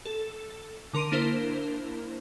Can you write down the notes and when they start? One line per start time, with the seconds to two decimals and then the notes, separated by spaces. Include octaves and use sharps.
0.05 A4
0.93 D3 A#4 C6 D7 D#7
1.12 A#3 D4 E4 A#4 C5